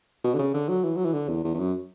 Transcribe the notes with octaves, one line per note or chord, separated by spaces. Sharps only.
B2
D3
C#3
D3
F#3
E3
F#3
E3
D3
E2
E2
E2
F#2